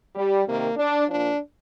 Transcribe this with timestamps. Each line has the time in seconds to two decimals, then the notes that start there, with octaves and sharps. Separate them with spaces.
0.15 G3
0.46 C3 D#3 A#3
0.77 D4
1.09 A#2 F3 D4